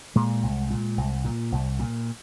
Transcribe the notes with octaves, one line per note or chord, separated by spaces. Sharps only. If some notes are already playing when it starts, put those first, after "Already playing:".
A#2 G#3
C2
A#2
C2
A#2
C2
A#2